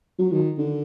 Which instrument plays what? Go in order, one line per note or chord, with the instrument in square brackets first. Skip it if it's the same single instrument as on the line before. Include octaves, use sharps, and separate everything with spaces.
[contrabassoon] F#3
D#3
D3